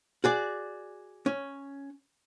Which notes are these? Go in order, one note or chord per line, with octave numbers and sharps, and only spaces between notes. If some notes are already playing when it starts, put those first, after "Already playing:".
F#4 G#4 D5
C#4